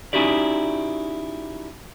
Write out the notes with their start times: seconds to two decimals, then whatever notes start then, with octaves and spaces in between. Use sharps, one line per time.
0.13 C#4 D#4 E4 F#4 G4 D5